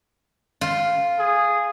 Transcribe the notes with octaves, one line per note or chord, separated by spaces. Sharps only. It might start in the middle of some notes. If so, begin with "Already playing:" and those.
F4
G#4